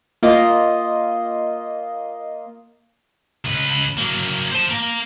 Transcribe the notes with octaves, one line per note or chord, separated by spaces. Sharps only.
A#3 F4 D#5
C#2 B4
F#3 A#3
C5 A5
A#3